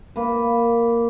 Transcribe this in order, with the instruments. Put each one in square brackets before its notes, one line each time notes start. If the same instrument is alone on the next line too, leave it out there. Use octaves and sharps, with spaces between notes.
[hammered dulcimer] A#3 B4